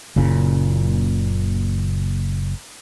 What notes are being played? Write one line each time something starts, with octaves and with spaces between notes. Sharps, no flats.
F#1 A#2 C#3